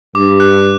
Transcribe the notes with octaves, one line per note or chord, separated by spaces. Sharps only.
G2 D6
F#6